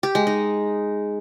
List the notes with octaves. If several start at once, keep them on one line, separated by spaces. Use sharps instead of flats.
G4
G#3
D#4